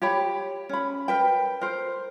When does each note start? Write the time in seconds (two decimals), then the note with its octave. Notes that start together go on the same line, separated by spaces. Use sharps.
0.02 G4 C#5 G5 B5
0.69 C#4 B5
1.08 A#4 B4 G5
1.61 A#4 C5